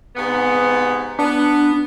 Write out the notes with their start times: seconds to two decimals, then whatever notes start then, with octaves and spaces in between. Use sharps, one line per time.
0.16 G#2 C3 B3
1.19 B3 D4